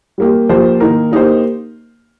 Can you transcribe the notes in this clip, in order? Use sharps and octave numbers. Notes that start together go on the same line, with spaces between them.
G3 A#3 G4
F3 A#3 G4 C5
D#3 A#3 D#4 A#4
A#3 D#4 G4 C5